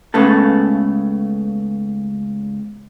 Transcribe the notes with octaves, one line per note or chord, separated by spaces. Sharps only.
C#2 C#3 A3 B3 A4